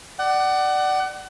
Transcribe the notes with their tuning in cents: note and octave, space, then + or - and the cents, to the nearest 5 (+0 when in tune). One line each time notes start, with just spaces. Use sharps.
D5 +15 F#5 +30